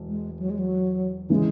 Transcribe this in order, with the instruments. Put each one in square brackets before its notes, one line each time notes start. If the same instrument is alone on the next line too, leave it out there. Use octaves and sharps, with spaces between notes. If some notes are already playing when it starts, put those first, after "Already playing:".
Already playing: [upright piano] E1
[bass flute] G#3
F#3
G#3
F#3
[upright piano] C#3 E3 [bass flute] G#3